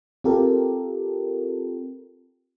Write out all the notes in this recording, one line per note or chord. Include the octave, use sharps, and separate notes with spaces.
C4 F4 G4 A4 A#4